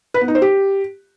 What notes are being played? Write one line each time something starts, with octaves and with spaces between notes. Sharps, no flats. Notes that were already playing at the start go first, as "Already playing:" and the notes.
B4
B3
D#4
C5
G4